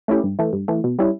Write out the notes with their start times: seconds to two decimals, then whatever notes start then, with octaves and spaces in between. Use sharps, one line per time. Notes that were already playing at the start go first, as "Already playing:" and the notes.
0.08 A3 C#4 E4 G4
0.24 G2
0.39 E3 A3
0.53 G2
0.68 E3 A3
0.84 B2
0.99 G3 C#4 E4